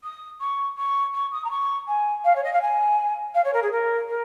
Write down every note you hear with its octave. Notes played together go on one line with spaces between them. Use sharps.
D#6
C#6
C#6
C#6
D#6
A#5
C#6
G#5
F5
C#5
D#5
F5
G#5
F5
C#5
A#4
G#4
A#4
A#4